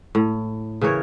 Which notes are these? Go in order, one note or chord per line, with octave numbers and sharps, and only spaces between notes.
A2
C#3 E3 A#4 C#5